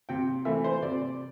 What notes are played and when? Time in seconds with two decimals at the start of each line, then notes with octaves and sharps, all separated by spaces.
0.09 C3 G5
0.45 E3 A3 C4 E5
0.64 C5
0.82 C3 D5